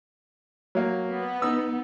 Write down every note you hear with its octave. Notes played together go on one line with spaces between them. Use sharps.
F#3 A#3
B3
D#4 E6